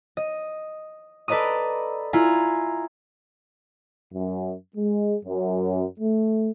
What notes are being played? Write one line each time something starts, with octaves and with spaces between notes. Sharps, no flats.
D#5
A4 B4 D5 D#5 A#5 D#6
E4 F4 G#5 A#5
F#2
G#3
F#2
A3